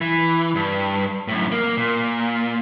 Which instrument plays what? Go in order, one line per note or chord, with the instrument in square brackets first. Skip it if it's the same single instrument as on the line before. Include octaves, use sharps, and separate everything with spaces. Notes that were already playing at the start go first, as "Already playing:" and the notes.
[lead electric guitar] E3
G2
F#2 A2
A#3
A#2